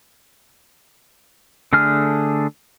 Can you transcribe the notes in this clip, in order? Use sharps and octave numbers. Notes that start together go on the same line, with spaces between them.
D3 A3 D4 G#4 F6